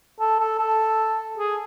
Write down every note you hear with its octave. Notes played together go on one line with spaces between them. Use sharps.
A4
A4
A4
G#4